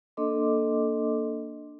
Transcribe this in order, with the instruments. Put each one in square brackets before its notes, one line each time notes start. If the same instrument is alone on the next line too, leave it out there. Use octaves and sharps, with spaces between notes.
[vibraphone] A#3 D4 A4 D#5 C6 D6